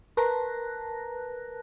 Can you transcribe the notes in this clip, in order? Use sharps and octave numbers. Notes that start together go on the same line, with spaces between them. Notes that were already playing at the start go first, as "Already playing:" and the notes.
A#4 B4 A5 A#5 F#6 A#6